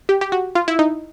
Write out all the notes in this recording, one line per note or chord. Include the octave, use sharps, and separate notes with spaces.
G4
G4
F#4
F4
E4
D#4